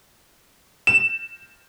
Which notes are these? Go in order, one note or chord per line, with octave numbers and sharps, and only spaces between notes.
E7